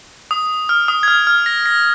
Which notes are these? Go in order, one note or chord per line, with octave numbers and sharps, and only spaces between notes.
D#6
F6
D#6
G#6
F6
F6
A#6
A#6